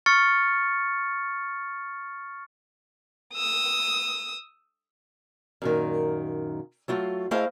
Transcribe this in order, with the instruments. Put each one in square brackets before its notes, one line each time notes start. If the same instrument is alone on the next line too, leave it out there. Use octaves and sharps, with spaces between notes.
[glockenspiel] C#6 F6 A6 C#7
[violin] D#6 E6
[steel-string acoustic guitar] F#2 A#2 D#3
F#3 A3 F4
A3 E4 G#4 C5 D#5 F5